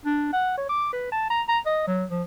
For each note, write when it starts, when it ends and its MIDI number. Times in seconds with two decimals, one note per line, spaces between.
0.06 0.29 62
0.33 0.55 78
0.58 0.65 73
0.69 0.90 86
0.93 1.08 71
1.12 1.29 81
1.30 1.42 82
1.49 1.59 82
1.66 1.84 75
1.87 2.05 54
2.10 2.23 53